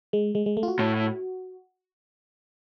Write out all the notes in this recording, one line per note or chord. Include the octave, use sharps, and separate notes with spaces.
G#3
G#3
G#3
A3
F4
F#4
A2